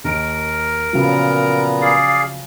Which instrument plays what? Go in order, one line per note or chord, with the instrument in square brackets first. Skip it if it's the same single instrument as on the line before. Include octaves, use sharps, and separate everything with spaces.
[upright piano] D#2 D7 [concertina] A#4
[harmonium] A#2 B3 A#5 [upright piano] C#3 F3 F#3
[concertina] G#4 D5 F5